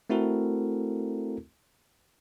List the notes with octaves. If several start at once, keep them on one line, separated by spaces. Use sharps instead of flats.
A3 C4 E4 F#4 A4 A#4